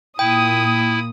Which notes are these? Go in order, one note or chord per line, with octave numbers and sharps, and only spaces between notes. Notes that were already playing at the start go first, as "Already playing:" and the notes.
A#2 E4 G5 D#6